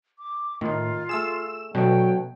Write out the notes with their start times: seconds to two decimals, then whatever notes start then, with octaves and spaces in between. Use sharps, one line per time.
0.19 D6
0.61 A2 D#3 D#4 F4
1.09 A3 G#4 E6 E7
1.75 B2 D3 F#3 A3 G5